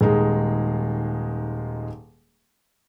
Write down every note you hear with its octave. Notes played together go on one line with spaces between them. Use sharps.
D#1 D#3 G#3 D#4 G#4